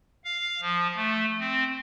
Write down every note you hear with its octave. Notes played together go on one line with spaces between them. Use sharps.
F5
F3
A3
C4